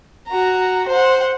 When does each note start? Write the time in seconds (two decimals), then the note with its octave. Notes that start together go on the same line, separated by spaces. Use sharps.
0.27 F#4 A#5
0.88 C5 F#5